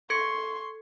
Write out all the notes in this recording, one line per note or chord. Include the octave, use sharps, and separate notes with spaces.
A4 C6 C#6 G#6 C#7